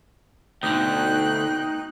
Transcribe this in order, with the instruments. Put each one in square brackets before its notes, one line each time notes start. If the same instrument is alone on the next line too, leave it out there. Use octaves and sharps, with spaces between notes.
[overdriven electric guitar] D2 D3 [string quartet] B2 F#6 [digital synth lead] D#4 [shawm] G5